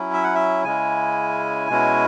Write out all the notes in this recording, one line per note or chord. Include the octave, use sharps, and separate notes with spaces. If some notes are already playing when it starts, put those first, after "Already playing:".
Already playing: F#3 C#4 E4
E5
F#5
E5
C#3 G#3 C#4 E4 G#5
B2 G#3 C#4 E4